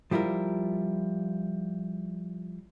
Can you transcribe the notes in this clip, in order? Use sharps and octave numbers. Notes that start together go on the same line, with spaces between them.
F3 G3 E4 F4 A#4